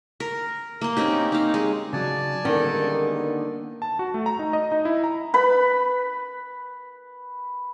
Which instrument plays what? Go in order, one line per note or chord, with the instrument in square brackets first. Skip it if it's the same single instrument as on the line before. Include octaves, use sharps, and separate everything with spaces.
[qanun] A#4
A#3 C6
C4 C#4 D#4 G4
D#4 F5
G#3
[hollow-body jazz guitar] C#3 F#3 [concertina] D5 G#5 A5
[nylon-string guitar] D3 D#3 [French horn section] G3 G#3 A#3 [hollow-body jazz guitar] B3 C#4 A#4
[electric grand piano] A5
F#4
A3
A#5
D#4
D#5
D#4
E4
A#5
[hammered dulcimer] B4 B5